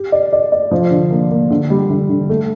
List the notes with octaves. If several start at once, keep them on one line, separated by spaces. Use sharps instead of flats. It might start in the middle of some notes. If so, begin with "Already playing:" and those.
Already playing: G4
D5
D5
D5
F3
D3
A#3
A#3
D3
G3
D3
D3
A3